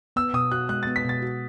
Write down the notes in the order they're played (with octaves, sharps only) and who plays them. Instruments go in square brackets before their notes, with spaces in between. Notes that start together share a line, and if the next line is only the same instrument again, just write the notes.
[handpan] B3 [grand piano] E6
[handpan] B2 [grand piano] D#6
[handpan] F#4 [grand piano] F#6
[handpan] G#3 [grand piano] F#6
[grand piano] A6
[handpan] B3
[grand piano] B6
[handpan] B2 [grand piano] A6
[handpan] F#4